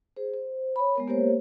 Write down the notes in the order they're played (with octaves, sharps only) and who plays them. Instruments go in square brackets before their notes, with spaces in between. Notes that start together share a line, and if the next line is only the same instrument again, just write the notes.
[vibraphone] G#4 C5
C5
C#5 B5
G#3 B3 A#4
A#3 G4 A#4 C5 C#5